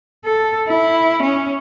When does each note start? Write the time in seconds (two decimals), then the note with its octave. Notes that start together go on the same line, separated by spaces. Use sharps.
0.25 A4
0.68 E4
1.22 C#4